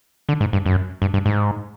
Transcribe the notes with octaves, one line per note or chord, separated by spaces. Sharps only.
D3
G#2
G2
F#2
G2
G2
G#2